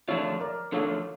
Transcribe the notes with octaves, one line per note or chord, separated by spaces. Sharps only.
D3 F3 A3 D4 F4 C#5 E5
A#4 D5
D3 F3 A3 D4 F4 A4 C#5